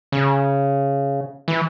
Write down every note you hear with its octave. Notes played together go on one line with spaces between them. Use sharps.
C#3
E3